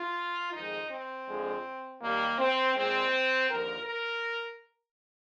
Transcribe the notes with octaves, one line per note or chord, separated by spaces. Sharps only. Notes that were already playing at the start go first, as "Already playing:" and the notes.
Already playing: F4
F2 D#3 G#3 D#4
C4
F2 D3 F3 G#3
D#2 D#3 G3 A#3
C4
A#2 G#3 C4
D#2 D3 F3 A#4
A#4